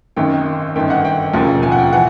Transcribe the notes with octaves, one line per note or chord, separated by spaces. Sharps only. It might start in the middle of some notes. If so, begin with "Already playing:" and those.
G#1 F#2 D#3 G5
G1 F#2 D#3 G5
F#5
G5
E1 D#2 C#3 F3
G#5
F#5
G5
E3 F#5